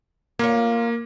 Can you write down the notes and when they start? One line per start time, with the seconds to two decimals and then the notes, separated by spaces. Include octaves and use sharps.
0.39 A#3 F4 C#5